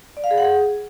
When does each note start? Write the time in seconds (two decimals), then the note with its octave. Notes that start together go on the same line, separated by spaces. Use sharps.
0.17 D5
0.24 F5
0.31 G#4
0.38 F#5
0.45 G#4